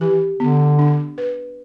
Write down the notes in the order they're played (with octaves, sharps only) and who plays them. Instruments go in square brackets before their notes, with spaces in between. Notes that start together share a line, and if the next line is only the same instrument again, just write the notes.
[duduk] E3 [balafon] G4
[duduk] D3 [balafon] B3
[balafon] D4
B4